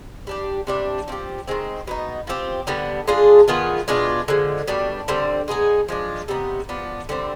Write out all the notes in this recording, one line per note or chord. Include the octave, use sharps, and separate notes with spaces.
G3 D4 G4
C3 G3 D4
F3 C4 G4
D#3 G#3 C4
B2 B3 D#4
F3 C4 G4
D3 G3 B3
G#3 D4 F4 G#4
D#3 B3 F4 G#4
B2 G#3 D4 F4
D3 F3 G#3
B2 G3 D4
D3 G3 C4
G#3 B3 D#4 G#4
F3 G#3 D4
C3 G3 B3 D#4
F3 B3 D4
D3 G3 C4